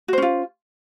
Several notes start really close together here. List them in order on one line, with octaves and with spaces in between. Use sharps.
F#4 C5 C#4 F4